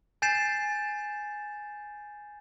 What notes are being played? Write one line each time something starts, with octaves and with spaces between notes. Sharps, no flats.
G#5 G6 A6 C7 E7